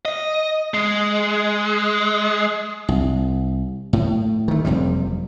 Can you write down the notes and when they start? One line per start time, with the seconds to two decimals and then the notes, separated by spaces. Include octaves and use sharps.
0.05 D#5
0.74 G#3
2.88 C2
3.93 A2
4.48 D#3 A3
4.65 F#1 F2 C3 G3